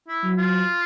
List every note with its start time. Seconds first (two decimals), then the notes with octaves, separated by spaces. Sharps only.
0.08 E4
0.24 F#3
0.37 F4